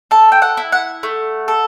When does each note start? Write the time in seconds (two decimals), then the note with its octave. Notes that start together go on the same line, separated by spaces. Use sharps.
0.11 A4 A5
0.32 G5
0.42 F#5
0.57 E4
0.72 F#5
1.03 A3
1.48 A4